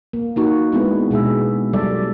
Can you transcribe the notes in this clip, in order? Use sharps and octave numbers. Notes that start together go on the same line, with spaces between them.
A#3
A#3 D#4 F#4
G#3 B3 D4 E4
B2 G#3 G#4 E5
F#3 G3 A4 D5 E5